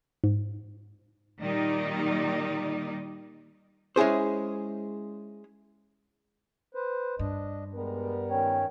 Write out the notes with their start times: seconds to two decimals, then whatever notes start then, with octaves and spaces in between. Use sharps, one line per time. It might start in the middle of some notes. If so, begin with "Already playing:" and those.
0.24 G#2
1.41 A#2 D#3 G3 D#4 D5
3.96 G#3 C#4 E4 G#4 C5
6.74 B4 C5
7.19 G2 D4 D#5
7.74 G3 G#3 B3 A#4
8.30 D#3 C#4 C#5 G5